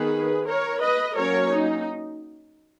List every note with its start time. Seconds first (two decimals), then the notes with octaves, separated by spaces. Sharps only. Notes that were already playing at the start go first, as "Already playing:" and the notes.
Already playing: D#3 B3 G#4 B4
0.46 A#4 C#5
0.81 B4 D#5
1.16 F#3 A#3 C#4 A#4 C#5
1.51 D#4